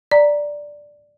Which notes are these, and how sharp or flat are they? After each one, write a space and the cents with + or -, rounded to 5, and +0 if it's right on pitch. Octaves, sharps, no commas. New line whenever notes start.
D5 +0 A#5 +0